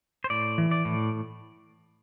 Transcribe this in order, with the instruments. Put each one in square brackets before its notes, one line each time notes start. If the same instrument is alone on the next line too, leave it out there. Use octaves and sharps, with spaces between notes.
[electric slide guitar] C5
A2 D5
E3
D5
A2